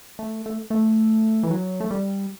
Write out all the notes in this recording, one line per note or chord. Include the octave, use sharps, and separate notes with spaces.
A3
A3
A3
E3
F#3
A3
G3